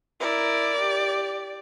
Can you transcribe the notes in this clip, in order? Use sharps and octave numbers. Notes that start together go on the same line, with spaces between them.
E4 A#4 D5
G4